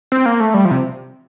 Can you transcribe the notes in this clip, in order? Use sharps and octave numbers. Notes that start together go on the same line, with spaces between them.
C4
A#3
A3
G3
F3
C3